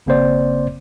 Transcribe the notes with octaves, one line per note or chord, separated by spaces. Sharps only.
G#1 C#3 A#3 C4 C5 D5